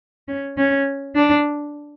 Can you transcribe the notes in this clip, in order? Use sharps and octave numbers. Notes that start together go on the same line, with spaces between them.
C#4
C#4
D4